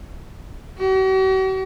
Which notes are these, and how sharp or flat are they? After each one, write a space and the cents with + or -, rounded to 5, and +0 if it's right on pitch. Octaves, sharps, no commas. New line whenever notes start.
F#4 +45